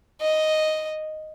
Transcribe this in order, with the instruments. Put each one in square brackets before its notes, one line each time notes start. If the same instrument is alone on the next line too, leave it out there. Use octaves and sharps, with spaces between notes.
[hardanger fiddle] D#5